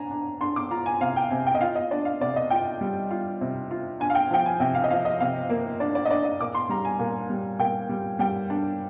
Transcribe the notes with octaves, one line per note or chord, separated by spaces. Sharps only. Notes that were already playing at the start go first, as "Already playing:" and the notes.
Already playing: D4 G#5 A#5
D4
D4 C6
D6
F4 A#5
G#5
C3 F5
G5
C3 G#5
G5
D#5
F4 F5
D#5
D4 D5
F5
C3 D5
D#5
F4 G5
G3
F4
C3
F4
D4 G#5
F5
G5
F3 G5
G#5
C3 G5
F5
D#5
F3 F5
D#5
C3 F5
A#3
D4 D5
D5
D#5
D4 D5
D#5
A#2 D6
C6
G3 A#5
G#5
A#2
G3
A#2 G5
G3
G3 G5
D4